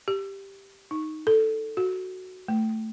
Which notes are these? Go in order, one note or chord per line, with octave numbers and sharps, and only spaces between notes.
G4
D#4
A4
F#4
A3